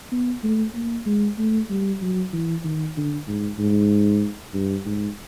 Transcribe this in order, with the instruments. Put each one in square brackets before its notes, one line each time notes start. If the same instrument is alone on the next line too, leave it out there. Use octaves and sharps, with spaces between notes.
[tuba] B3
A3
A#3
G#3
A3
G3
F#3
E3
D#3
D3
G#2
G#2
G2
G#2